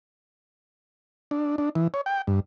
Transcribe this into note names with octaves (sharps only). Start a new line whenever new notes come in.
D4
D4
E3
C#5
G5
G2